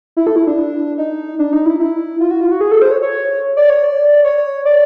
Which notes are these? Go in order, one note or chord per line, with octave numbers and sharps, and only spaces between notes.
E4
A4
E4
D4
D#4
D4
D#4
E4
E4
F4
F#4
F4
F#4
G#4
A4
C5
C#5
C#5
D5
C#5
D5
C#5
D5